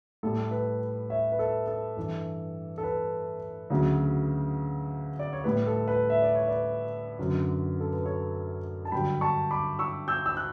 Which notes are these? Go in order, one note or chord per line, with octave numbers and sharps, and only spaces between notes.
A2 G3 A4
B4
C#5 E5
B4
A4
A4
G2 E3 G3
A4
B4
D2 C#3 F#3
D5
C#5
A2 G3 B4
A4
B4
E5
D5
C#5
B4 D5
F#2 D3 F#3
A4
B4
A4 C#5
A5
G2 D3 F#3 G5 B5
A5 C#6
B5 D6
C#6 E6
E6 G6
E6
F#6